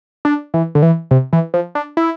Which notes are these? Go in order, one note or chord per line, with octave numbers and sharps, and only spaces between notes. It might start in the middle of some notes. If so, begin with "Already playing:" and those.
D4
E3
D3
E3
C3
E3
F3
D4
E4